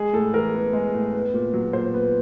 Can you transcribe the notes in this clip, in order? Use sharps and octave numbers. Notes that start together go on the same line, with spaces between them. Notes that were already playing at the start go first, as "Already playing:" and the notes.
Already playing: G#3 G#4
A2 A4
E3 A#4
B3
G#3
A2
B3
A#2
F#3
A#2 C5
B3